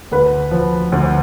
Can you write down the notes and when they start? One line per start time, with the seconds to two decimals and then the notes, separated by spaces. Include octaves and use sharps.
0.11 D2 B4
0.51 F3
0.92 D2